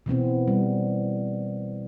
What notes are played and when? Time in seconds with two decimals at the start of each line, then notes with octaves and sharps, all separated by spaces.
0.06 B2 E3 B3 C4
0.48 G3